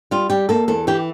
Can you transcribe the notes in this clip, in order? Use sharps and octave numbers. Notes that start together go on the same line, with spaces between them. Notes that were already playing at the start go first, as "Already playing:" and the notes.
G3 F4
G3 G4
A#3 A4
E2 A4
E3 G4